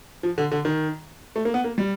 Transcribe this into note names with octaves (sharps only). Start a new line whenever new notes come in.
F3
D3
D3
D#3
A3
A#3
B3
A#3
G3